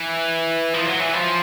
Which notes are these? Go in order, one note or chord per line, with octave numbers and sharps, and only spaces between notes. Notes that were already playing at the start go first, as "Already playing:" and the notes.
Already playing: E3
F3
F#3
E3
F3